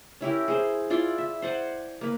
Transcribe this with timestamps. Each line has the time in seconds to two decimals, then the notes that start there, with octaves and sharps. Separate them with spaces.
0.21 C#4 E4 G4 A#4
0.48 G#4 C5
0.90 E4 F4 D5 C6
1.18 E5
1.42 C5 D5 F#5 G#5
2.01 A#3 B4